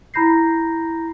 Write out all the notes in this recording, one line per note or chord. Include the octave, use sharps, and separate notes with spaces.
E4 A#5 B5 G6 A#6 C7